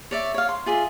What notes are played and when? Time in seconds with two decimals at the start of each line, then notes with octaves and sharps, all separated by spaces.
0.11 C#5 D5 E5
0.34 C#5 F5
0.49 C6
0.66 F4 G#4 D5 E5